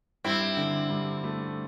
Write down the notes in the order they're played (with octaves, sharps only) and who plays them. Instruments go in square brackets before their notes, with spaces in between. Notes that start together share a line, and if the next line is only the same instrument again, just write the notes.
[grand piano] G2 [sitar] C4 E4
[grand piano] D3
G2
A3